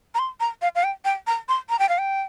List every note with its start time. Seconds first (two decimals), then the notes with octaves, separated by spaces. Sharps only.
0.15 A#5
0.19 C6
0.40 A#5
0.62 F5
0.75 F5
0.84 G5
1.05 G5
1.27 A#5
1.49 C6
1.70 A#5
1.79 G5
1.89 F5
1.98 G5